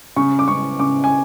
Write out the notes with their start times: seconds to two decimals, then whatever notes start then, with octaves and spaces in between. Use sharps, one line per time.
0.16 C#3 C#6
0.39 D6
0.48 C#3 C#6
0.79 C#3 D6
1.04 G#5